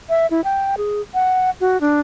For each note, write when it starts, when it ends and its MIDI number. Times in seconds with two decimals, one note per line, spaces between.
0.09 0.27 76
0.31 0.41 64
0.44 0.75 79
0.78 1.01 68
1.14 1.50 78
1.61 1.80 66
1.81 2.00 62